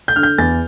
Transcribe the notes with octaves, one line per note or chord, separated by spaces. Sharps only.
G6
D3 F6
G6
E2 A6